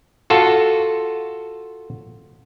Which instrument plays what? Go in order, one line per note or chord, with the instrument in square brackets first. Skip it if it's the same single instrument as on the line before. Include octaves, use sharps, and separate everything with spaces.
[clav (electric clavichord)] F4 F#4 A4